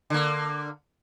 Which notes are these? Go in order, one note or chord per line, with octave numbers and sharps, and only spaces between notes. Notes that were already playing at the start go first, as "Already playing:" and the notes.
D3 A#3